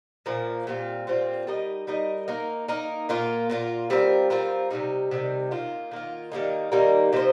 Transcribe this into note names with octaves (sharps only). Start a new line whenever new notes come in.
A#2 F3 A#3
A#2 G3 C4 F4
A#2 G3 C4 F4
G3 D#4 A#4 D#5
G3 D#4 A#4 D#5
A#3 D#4 A#4
A#3 D#4 A#4
A#2 A#3 F4
A#2 A#3 F4
G3 C4 F4 A#4
G3 C4 F4 A#4
C3 D#3 G3 D#4
C3 D#3 G3 D#4
D#3 A#3 F4
D#3 A#3 F4
D#3 G3 A#3 D#4
D#3 G3 A#3 D#4
C3 F3 D#4 C5